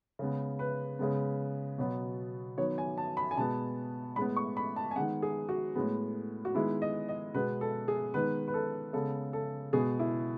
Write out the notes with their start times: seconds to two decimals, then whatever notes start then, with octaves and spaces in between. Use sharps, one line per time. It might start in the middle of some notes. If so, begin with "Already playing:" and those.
0.19 C#3 G#3 B3
0.59 B4
0.99 C#3 G#3 B3
1.78 B2 F#3 B3
2.57 D#3 F#3 B3 C#5
2.78 G#5
2.98 A5
3.17 B5
3.31 G#5
3.37 B2 G#3 B3 A5
4.16 A2 G#3 B3 B5
4.36 C#6
4.57 B5
4.76 A5
4.91 G#5
4.96 D#3 G#3 B3 F#5
5.22 G#4
5.49 F#4
5.75 A2 G#3 B3
6.45 F#4
6.54 D#3 G#3 B3 E4
6.82 D#5
7.09 D#5
7.34 B2 G#3 B3 B4
7.61 A4
7.88 G#4
8.14 D#3 G#3 B3 B4
8.48 B4
8.54 A4
8.93 C#3 G#3 B3 A4
9.33 A4
9.73 B2 G#3 B3 G#4
9.99 E4